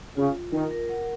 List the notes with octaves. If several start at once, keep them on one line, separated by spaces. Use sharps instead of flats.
C#3 F4
F4
D#3 A#4
A#4
F#5